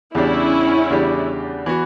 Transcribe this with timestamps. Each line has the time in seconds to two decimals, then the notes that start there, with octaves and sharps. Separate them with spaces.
0.14 E2 C#3 G3 C#4 D4 E4 G4
0.90 E2 C#3 G3 D4 G4
1.66 E3 B3 F#4